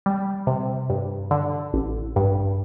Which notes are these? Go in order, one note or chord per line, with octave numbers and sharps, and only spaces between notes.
G3
C3
G2
D3
A1
G2